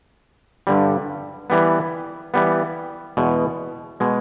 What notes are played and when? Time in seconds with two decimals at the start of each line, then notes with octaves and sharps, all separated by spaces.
0.67 G2 D3 G3
1.50 E3 G3 B3
2.34 E3 G3 B3
3.17 E2 B2 G#3
4.00 B2 G#3